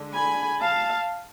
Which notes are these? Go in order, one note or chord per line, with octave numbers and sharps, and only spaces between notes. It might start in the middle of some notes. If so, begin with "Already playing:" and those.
Already playing: D3 G#3 D4
G#5 B5
F5 A5